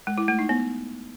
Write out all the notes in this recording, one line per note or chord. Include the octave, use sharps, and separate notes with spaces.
G#3
E4
A3
D#4
B3